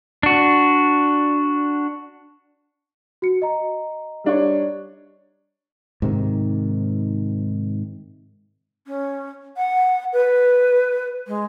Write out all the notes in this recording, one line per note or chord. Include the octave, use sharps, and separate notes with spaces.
D4 F#4
F#4 C#7
D#5 A#5
G3 D4 C#5
G#2 C3 D#3
C#4
F#5
B4
G#3